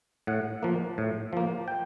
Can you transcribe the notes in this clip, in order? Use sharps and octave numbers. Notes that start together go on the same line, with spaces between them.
A2 F#5
F3 A#3
A2
F3 A#3
G5